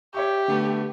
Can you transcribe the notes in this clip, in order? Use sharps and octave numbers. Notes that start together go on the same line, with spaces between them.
G4 C#5 E5 C#6
D3 A3 B3